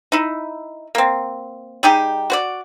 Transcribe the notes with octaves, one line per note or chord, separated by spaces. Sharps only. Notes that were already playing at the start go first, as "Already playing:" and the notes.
D#4 E4
A#3 C4
G3 D#4 G4 G#4
F#4 C5 D5